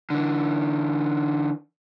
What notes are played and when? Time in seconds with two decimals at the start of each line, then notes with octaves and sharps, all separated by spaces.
0.10 D3 E3